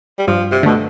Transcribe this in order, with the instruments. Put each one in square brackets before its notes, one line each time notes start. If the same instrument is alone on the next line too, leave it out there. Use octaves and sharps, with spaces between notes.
[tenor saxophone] G3
[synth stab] G2 [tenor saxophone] F3
[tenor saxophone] C3
[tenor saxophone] B2 [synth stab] D3 A3